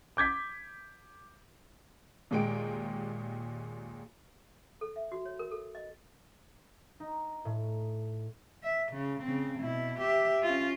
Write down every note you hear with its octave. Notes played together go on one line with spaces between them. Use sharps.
D6 G6 G#6 B6
D#2 A#2 G#3 G5 D7
A4
E5
F#4
C#5
A#4
A4
D#5
D#4
A2
E5
C#3
C#3 C4
B2 E4
G4 E5
C#4 F4